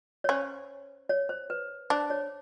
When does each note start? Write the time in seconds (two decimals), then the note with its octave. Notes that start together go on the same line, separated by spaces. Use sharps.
0.24 C#5
0.29 C#4 C5
1.09 C#5
1.29 C5
1.50 B4
1.90 D4 C5
2.10 C#5